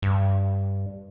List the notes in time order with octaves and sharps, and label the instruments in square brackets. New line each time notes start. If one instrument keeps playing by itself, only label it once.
[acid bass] G2